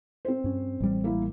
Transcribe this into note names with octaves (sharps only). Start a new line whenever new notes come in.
C4 C5
G2 C#4
A1 G3
A#3 E4 A#4